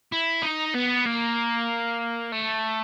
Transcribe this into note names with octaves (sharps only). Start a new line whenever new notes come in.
E4
D#4
B3
A#3
A3